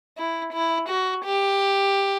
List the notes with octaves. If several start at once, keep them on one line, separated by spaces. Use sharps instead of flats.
E4
E4
F#4
G4